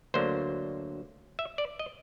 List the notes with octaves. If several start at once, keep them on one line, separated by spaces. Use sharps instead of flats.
D2 D3 F#3 A#3 C5
E5
D5
D#5